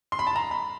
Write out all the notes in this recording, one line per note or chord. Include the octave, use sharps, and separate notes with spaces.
C6
B5
A5
A#5
B5